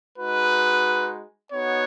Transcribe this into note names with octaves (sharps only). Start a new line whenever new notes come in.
G#3 D#4 F#4 B4
B3 D#4 F#4 C#5